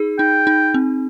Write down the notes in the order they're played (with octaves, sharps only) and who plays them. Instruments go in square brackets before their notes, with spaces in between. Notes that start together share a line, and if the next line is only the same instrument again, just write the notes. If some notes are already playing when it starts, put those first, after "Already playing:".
Already playing: [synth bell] D#4 G#4
[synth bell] D#4 [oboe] G5
[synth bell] D#4
C4